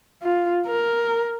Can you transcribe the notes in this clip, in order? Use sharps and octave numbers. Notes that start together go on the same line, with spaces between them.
F4
A#4